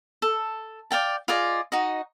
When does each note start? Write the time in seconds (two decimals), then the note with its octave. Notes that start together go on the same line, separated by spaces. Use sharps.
0.22 A4
0.91 D5 F5 G5 A5
1.28 F4 G#4 D5 D#5
1.72 D#4 F#4 D#5